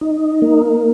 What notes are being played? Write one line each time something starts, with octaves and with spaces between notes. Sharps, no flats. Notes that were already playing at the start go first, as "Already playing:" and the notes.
D#4
A#3